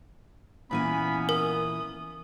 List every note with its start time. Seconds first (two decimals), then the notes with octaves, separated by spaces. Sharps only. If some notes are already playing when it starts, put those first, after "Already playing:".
0.71 A#2 E3 A#3 B3 C#4 G#5 B5
1.29 A#4 D#6